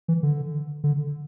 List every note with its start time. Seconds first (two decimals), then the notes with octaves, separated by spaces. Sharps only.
0.08 E3
0.23 D3
0.84 D3